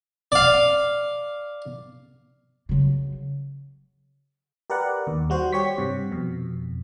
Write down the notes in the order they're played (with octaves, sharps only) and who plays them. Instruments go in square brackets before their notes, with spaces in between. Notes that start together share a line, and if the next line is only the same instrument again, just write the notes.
[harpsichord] D5 F5
[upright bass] C#3 F#3
[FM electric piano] G4 A#4 B4 D5 F#5
D#2
G3 F#4 C5
G4 C#5 C#6 B6
G2 C3
F2 B2